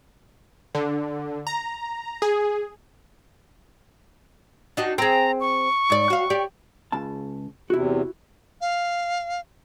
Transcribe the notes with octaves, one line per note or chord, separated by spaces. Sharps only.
D3
A#5
G#4
D4 D#4 F#4
C4 G#4 A#5
C#6
G#2 D5
F#4 F5
G4 D5
C#2 C#3 A5
E2 C3 E4 F#4
F5